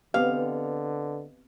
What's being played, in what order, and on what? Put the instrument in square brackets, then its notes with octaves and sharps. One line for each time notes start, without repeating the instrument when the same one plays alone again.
[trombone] D3 [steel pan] B3 C4 G4 [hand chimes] B4 D#5 [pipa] F5